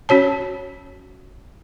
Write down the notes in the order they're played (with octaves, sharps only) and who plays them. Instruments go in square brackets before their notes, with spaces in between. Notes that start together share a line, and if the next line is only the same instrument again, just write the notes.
[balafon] C#4 F#4 C#5 A5